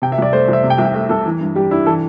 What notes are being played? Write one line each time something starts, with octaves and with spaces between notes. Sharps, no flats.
C3 G5
E5
C2 D5
A3 C5
C2 E5
C3
G5
C2 E5
G5
A3 E5
C2 A4
E3
G2
G3 G4
D4 E4
E3 A4